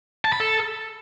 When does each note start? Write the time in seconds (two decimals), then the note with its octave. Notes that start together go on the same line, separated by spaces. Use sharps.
0.25 A5
0.32 B5
0.40 A4